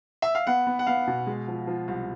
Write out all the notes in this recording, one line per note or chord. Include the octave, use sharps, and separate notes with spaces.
E5
F5
B3 F#5
B3
F#5
B3 F5
B2
G#3
F3
F3
C2